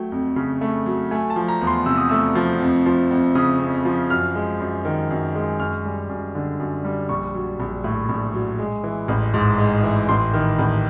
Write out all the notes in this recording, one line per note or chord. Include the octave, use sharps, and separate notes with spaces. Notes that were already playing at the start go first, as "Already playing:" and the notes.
Already playing: F#3 A3 G5
F2
C#3
A3
F#3
A3 G#5
A5
F3
A#5
E2
C6
C3 E6
D#6
A3 E6
F3
F2
F3
F2
C#3 D#6
F2
F3
F#2 F6
G#3
F#2
D#3
F#2
G#3
F#2 F6
G3
F#2
D3
F#2
G3
A#1 C#6
F#3
A#1
A2
A#1
F#3
G#3
E3
A1
G#2
G#3
E3
A1 C6
D#3
A1